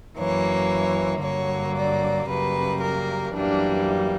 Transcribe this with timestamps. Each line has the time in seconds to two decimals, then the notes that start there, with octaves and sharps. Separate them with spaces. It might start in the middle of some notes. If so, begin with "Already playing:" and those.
0.17 F#2 E3 A#3 C#5
1.22 G2 D3 F#3 A#3 C#5
1.76 D5
2.28 F#2 C#3 G3 A#3 B4
2.80 A#4
3.33 F#2 E3 G3 A#3 D4